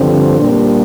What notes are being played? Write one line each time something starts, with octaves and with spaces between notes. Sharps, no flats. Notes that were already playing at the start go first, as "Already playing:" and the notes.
Already playing: G2 D3 F3 C4
A#2 G3 A#3 D4 C5